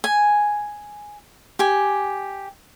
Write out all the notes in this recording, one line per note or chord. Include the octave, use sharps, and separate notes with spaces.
G#5
G4 G#5